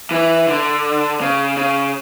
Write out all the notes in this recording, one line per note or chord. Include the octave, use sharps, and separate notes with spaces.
E3
D3
C#3
C#3